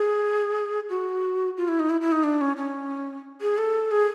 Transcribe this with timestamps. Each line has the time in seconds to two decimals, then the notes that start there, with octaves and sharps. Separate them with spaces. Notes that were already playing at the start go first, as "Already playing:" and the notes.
Already playing: G#4
0.89 F#4
1.57 F4
1.68 E4
1.80 D#4
1.90 E4
2.01 E4
2.12 D#4
2.24 D4
2.41 C#4
2.57 C#4
3.41 G#4
3.58 A4
3.91 G#4